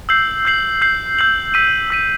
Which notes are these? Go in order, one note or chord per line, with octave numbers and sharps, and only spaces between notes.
E6 G6 C7 F#7
E6 G6 C7 F#7
E6 G6 C7 F#7
E6 G6 C7 F#7
E6 B6 D#7
E6 B6 D#7